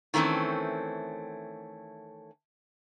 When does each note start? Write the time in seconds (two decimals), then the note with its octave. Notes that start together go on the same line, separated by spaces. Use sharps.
0.14 D#3 E3 A3 C4 C#4